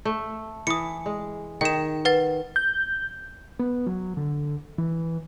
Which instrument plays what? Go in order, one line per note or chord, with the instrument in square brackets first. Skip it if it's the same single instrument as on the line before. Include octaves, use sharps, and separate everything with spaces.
[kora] A3
[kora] E3 [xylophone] D#6 C#7
[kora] G#3
[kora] D#3 G#4 [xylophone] G5 E7
[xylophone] B4 F#5 A6
[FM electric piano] G6
[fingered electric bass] B3
F#3
D3
E3